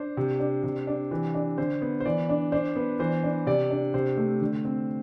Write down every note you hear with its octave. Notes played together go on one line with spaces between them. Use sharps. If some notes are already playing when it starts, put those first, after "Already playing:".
Already playing: D4 C5
C3
D4
C3
D4
E3
D4
D3 C5
B3
C5
E3 D5
D4
D4 C5
B3 B4
E3 C5
D4
C3 D5
D4
C3 C5
A3
D3
C4